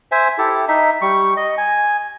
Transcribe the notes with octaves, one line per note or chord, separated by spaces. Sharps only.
C5 E5 G#5
E4 G4 A4
D#4 E5
G3 C#6
D#5
G#5